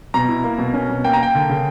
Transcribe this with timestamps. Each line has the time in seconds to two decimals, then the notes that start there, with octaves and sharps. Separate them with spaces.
0.14 B2 A#5
0.29 E4
0.44 A#3
0.59 B2
0.74 C#4
0.89 B2
1.04 A#3 G5
1.13 A#5
1.19 A#3 G5
1.35 D3
1.50 C#3